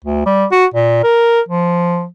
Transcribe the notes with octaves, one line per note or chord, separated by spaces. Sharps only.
D2
G3
F#4
A#2
A#4
F3